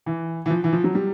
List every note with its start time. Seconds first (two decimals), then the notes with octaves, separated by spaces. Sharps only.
0.06 E3
0.46 E3
0.50 F3
0.64 E3
0.73 F3
0.84 F#3
0.95 G3